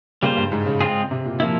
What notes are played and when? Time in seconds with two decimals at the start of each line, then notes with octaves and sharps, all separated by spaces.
0.22 C#3 G3 A#3 F4 C5
0.37 G2
0.52 G#2
0.66 C#3
0.81 G#3 C4 F4 G#4
1.11 C3
1.25 A#2
1.40 F3 A#3 E4